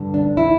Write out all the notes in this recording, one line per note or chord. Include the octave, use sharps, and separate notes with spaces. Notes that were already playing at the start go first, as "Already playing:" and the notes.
Already playing: G2 D3 G3
D4
E4